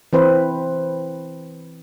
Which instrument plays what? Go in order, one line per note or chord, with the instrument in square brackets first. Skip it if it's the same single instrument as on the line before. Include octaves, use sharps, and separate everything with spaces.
[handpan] E3 C4 B4 C5